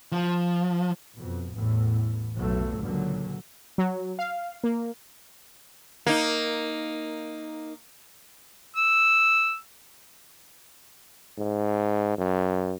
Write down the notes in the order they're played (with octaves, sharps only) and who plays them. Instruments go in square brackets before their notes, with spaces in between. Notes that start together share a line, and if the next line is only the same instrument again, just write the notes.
[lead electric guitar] F3
[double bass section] F2 B2
A1 E2 A2
F1 B1 F#3 A3
C#2 A#2 D3 F#3
[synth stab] F#3
F5
A#3
[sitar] A#3 D#4
[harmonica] E6
[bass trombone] G#2
F#2